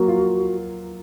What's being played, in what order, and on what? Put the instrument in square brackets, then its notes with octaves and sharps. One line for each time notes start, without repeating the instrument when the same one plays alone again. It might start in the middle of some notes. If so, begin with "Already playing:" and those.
Already playing: [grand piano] F#3 A#3 [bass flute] F#4
[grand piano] F4